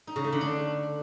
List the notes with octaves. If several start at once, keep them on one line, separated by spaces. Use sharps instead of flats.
D#4
C#3
A3
D3
D4